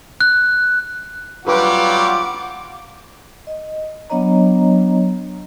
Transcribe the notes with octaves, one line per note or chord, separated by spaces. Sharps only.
F#6
F#3 G3 F4 G4 B4 F#5 D6
D#5
F#3 B3 D4 C#5 D#5 A#5